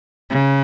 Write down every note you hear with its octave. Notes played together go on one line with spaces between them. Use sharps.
C#3